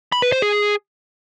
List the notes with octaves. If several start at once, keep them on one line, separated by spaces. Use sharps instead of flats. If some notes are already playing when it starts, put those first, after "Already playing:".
B5
B4
C5
G#4